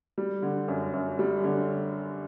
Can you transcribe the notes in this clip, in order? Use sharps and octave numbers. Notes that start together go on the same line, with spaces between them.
G3
D3
F#2
F#2
G3
D3